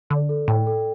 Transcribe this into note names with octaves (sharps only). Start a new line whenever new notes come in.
D3 D5
A4
A2 G5
A4